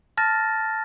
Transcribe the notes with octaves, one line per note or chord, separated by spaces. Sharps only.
A5 F6 A6 A#6